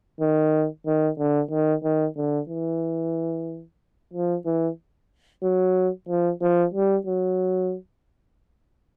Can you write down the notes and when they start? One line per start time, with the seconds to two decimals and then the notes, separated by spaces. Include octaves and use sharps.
0.20 D#3
0.86 D#3
1.19 D3
1.51 D#3
1.84 D#3
2.17 D3
2.49 E3
4.13 F3
4.45 E3
5.43 F#3
6.08 F3
6.42 F3
6.74 G3
7.07 F#3